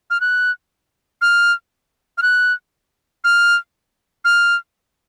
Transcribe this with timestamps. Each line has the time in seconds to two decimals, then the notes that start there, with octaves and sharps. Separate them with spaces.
0.11 F6
0.21 F#6
1.22 F6
2.18 F6
2.22 F#6
3.24 F6
4.25 F6